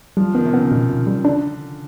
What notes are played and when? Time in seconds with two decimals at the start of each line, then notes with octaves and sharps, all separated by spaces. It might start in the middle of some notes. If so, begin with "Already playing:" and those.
0.17 F3 G3
0.35 D#3 B3
0.45 C3
0.53 C#3 B3
0.71 B2
0.89 B2
1.07 G3
1.25 D3 D4